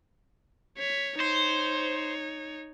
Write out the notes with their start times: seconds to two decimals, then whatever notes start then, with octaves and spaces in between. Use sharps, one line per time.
0.78 C#5 B6
1.20 D#4 C5 C#5